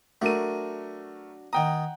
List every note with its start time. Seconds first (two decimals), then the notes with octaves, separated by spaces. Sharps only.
0.22 F#3 A3 D4 A#4 D#7
1.53 D#3 F#5 G5 A#5 D#6